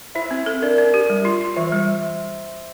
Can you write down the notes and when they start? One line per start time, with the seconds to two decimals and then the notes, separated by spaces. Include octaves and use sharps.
0.15 E4 C5 E5
0.31 C4
0.46 A4
0.62 D4 A#4 D5
0.78 D4
0.94 G4
1.10 G3
1.25 F4
1.41 F4
1.56 E3 C5 E5
1.72 G3